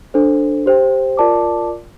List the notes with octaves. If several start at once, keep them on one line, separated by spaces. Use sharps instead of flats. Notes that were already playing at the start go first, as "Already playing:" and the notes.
D4 A4 C5
G4 C5 G5
F4 A#4 D5 A5 D6